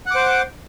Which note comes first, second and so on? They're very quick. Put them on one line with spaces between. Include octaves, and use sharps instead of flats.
F#5 D6 C5